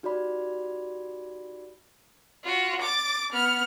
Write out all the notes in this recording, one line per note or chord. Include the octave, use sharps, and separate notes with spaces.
D#4 F#4 G4 D5 B5
F4 F#4
D6 A6
B3 F6